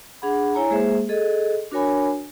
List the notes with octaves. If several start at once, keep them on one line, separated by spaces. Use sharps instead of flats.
D4 G#4 F#5 B5
E4 C#5 G#5 A#5
G#3 A#3 G#4 C5 E5
G#4 A4 D#5
D4 F#4 A#4 C#5 G#5 B5